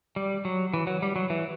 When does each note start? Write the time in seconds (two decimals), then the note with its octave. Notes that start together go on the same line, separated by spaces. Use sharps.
0.16 G3
0.45 F#3
0.74 E3
0.87 F#3
1.02 G3
1.16 F#3
1.30 E3